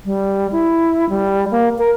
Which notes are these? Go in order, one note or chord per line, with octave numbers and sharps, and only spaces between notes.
G3
E4
G3
A#3
A#4